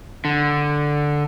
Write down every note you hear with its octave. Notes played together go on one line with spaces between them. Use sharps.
D3